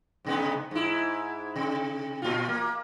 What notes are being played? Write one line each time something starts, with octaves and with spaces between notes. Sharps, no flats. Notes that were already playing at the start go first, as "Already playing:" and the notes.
G#2 C3 B3
G#2 E4
C3
A#2 F4
A#3